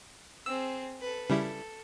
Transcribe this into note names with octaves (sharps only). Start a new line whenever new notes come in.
C4 G#4 E6
A4 B4
C#3 G3 E4 A4